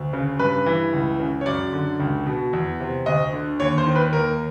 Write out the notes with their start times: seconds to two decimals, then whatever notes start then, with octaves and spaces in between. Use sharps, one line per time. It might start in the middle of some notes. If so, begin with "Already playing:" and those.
Already playing: D2
0.13 C#3
0.39 G2 B4
0.66 E3
0.93 C#2
1.20 C#3
1.41 C#5
1.46 F#2 D5
1.73 D3
2.00 C#2
2.26 B2
2.53 E2
2.80 C3
3.06 D2 D#5
3.33 D3
3.60 D#2 C#5
3.78 C5
3.87 D#3
3.96 B4
4.13 D#2 A#4